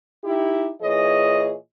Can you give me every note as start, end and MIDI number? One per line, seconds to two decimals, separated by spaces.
0.24 0.70 63
0.24 0.70 64
0.24 0.70 67
0.81 1.54 46
0.81 1.54 52
0.81 1.54 68
0.81 1.54 73
0.81 1.54 75